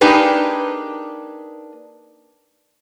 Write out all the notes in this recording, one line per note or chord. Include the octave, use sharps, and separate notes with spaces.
A#3 D4 D#4 G4 G#4 B4